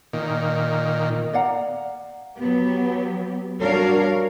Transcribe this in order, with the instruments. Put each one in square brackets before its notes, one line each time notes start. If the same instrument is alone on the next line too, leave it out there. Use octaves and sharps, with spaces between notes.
[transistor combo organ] A#2 D#3
[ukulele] D5 F5 F#5 A#5
[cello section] F#3 B3 G4
G3 D4 F#4 A#4 C#5 F5